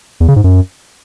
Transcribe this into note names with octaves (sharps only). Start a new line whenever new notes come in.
E2
C#3
G#2
F#2